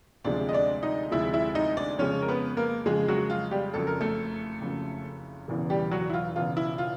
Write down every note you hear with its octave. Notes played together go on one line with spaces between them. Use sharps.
D2 C3 F3 G#3 D4 D5
D#5
D4 D5
D#4 D#5
D2 C3 F3 G#3 E4 E5
E4 E5
D#4 D#5
D4 D5
F2 C#3 F3 G#3 C#4 C#5
A#4
B3 B4
A#3 A#4
F2 C#3 F3 G#3 G#4
F#3 F#4
F4
G3 G4
F#1 F2 C#3 F#3 A4
A#4
A3 A4
F#1 F2 C#3 F#3
E1 E2 C#3 E3
G3 G4
F#3 F#4
E4
F4
E1 E2 C#3 E3 F4
E4
F4